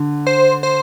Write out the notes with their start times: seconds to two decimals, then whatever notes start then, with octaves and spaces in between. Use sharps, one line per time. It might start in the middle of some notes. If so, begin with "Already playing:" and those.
Already playing: D3
0.27 C5
0.63 C5